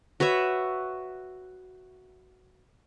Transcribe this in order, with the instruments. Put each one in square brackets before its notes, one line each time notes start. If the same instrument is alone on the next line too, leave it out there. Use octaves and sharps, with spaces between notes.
[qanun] F#4 B4 C#5 E5